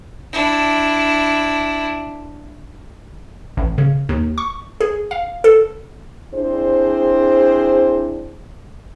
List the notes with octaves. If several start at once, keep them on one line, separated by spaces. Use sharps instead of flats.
D4 E4
A1
C#3
D#2
C#6
G#4
F5
A4
C4 D4 E4 G#4 C5